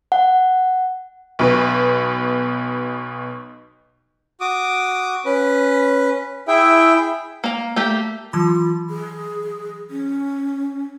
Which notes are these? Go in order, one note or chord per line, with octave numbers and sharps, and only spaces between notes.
F#5
B1 B2 B4
F#4 D6 D#6
C#4 B4
E4 G#4 E5 G5
A#3 A#5
A3 A#3 G4
E3 F#3 F4 B5
G#4
C#4